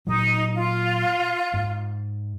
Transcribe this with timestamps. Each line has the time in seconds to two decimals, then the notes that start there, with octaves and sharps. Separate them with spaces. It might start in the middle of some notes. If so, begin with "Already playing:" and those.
0.07 A#2 F#3 D#4
0.56 F4
1.54 G#2